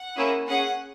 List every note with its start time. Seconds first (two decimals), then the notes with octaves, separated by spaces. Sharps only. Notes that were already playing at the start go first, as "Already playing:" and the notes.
Already playing: F#5
0.16 A#3 C#4 E4 G#4
0.47 C#4 G#4 F#5